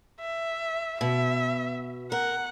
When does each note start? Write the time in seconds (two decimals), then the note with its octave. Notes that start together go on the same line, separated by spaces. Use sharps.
0.20 E5
1.01 B2 E5
2.12 A#4 F#5